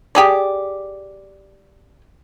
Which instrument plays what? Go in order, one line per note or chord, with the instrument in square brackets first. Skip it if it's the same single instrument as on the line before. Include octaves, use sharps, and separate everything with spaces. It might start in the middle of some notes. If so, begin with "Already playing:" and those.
[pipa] G4 G#4 D5